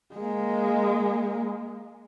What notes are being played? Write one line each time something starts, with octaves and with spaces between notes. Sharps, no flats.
G#3 A#3